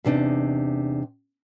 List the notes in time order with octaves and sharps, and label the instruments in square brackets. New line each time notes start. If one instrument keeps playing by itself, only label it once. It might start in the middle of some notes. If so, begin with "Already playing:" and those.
[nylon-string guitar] E2 C3 D4 D#4